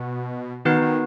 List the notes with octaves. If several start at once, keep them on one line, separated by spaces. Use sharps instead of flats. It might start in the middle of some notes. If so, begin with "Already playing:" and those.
Already playing: B2 B3 F#4 B4 F#5
D#3 B3 D#4 F#4 B4
D#3